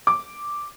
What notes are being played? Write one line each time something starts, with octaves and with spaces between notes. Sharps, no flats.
D6